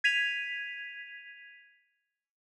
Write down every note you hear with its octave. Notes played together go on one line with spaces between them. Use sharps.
G#6 B6 D#7 F7